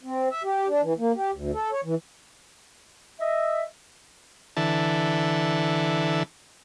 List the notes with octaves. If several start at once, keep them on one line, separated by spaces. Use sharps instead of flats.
C4
E5
G4
D4
E3
A#3
G4
D2
A4
C#5
E3
D#5 E5
D3 E3 A4